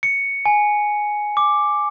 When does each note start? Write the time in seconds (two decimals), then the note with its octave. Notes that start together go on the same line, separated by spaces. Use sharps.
0.03 C#7
0.46 G#5
1.37 D6